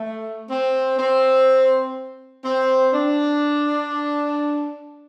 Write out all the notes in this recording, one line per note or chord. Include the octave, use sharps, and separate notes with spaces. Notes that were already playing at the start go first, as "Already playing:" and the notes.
Already playing: A3
C4
C4
C4
D4